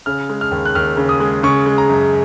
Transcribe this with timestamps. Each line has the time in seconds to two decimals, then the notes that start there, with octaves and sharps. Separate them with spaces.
0.06 C#3 F6
0.30 G#3
0.41 F6
0.51 D#2
0.65 F#6
0.75 D#2 F6
0.97 C#3
1.09 D#6
1.20 G#3
1.43 C#3 C#6
1.66 G#3
1.78 A#5
1.89 F#2